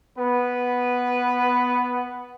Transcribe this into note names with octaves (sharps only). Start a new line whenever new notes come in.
B3 B4